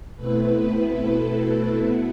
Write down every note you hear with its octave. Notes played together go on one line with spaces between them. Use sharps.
B2 A3 C4 E4 B4
A4
B2 B3 E4